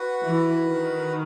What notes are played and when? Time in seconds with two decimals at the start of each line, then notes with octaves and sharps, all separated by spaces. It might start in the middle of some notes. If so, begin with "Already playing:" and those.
Already playing: F#4 B4 F#5
0.24 E3
0.65 D#3